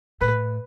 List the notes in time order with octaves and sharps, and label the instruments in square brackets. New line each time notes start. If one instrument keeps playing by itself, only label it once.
[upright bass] A2 [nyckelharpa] B4